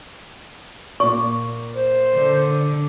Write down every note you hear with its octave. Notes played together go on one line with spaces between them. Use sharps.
A#2 D5 C#6
C5
D3